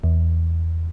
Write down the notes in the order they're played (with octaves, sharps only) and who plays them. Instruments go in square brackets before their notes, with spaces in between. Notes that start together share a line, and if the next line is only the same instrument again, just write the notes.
[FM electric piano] E2